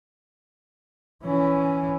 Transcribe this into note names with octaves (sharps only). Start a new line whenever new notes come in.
E3 C#4